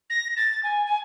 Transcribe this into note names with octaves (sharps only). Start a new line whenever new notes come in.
A#6
A6
G#5
G#5